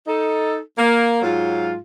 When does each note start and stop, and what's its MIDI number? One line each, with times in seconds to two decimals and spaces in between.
0.07 0.59 63
0.07 0.59 69
0.77 1.18 58
1.22 1.75 44
1.22 1.75 54
1.22 1.75 65